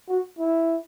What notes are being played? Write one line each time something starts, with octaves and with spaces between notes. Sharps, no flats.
F#4
E4